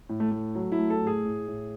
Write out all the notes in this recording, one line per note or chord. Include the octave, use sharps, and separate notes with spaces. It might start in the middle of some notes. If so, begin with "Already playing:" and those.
A2
A3
A3
F#3
E4
A3
A4
A2
G#4
A2
A2